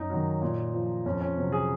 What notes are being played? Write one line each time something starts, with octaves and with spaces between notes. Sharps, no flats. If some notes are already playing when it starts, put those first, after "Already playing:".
Already playing: F#2 D#4
D#3 F#3
A#2
F3
F2 C#4
C#4
C3 F#3
G#4